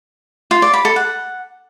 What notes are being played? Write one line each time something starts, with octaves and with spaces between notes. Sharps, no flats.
F4
D5
B5
A4
F#5